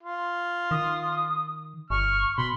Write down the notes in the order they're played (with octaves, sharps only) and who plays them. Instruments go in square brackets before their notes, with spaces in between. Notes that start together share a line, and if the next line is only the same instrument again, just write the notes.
[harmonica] F4
[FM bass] D#3 [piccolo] D#6
[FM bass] G1 [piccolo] C#6 [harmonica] F6
[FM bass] B2 [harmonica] B5 C6